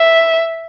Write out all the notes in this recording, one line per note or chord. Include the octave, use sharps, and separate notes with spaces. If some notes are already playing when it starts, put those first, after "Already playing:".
Already playing: E5